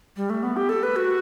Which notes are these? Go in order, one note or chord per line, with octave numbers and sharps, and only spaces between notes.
G3
A3
B3
G4
A4
B4
F#4